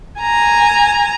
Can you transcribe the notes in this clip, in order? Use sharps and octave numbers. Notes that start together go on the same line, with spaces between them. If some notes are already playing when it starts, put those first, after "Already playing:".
G#5 A#5